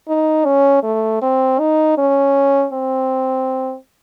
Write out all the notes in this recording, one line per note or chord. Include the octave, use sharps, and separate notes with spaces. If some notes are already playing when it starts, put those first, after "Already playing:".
D#4
C#4
A3
C4
D#4
C#4
C4